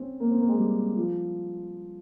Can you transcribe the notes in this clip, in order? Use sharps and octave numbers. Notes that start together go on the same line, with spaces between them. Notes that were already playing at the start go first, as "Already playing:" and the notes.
Already playing: C4 C#4
A#3
C4
A#3
G#3
G3
F3